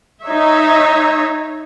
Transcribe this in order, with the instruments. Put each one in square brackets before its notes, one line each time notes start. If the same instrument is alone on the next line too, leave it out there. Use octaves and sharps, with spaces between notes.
[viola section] D#4 C#5 E5